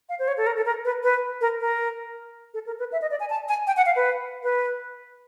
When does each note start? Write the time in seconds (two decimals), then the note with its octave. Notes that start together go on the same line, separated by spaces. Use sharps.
0.09 F5
0.19 C5
0.28 C#5
0.37 A4
0.47 A#4
0.57 A4
0.66 A#4
0.85 B4
1.04 B4
1.41 A#4
1.60 A#4
2.54 A4
2.66 A#4
2.79 B4
2.92 E5
3.02 D#5
3.11 D5
3.20 G#5
3.30 A5
3.49 G#5
3.67 G5
3.77 F#5
3.86 F5
3.96 B4
4.43 B4